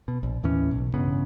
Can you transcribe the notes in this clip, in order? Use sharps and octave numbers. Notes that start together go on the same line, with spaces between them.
B2
A#1
D#2 A2 E3 C#4
B1
A1 G2 C#3 B3